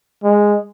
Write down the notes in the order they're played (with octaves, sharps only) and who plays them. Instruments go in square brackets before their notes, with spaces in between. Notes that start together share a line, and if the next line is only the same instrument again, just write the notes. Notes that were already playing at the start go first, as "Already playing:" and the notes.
[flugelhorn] G#3